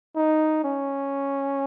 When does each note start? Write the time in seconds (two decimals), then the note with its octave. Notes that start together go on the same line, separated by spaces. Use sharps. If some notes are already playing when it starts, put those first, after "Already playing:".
0.16 D#4
0.64 C#4